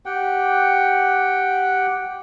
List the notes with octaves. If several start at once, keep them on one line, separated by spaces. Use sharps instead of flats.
G4 F#5 G5